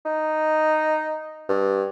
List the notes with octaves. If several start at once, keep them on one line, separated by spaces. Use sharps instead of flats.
D#4
G2